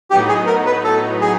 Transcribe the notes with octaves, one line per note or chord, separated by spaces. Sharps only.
A2 F#3 B3 D#4 G4
G#4
A#4
B4
A4
G#4